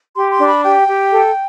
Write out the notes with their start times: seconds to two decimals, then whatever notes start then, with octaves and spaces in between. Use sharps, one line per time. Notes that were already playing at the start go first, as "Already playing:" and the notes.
0.15 G4 C6
0.31 C6
0.40 D4
0.48 B5
0.63 G4 G5
0.87 G4
1.11 A4